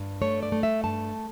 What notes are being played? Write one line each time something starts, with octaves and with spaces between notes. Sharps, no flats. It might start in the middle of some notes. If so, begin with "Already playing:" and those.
Already playing: G2
A3 C#5
D5
A3
E5
G2 A5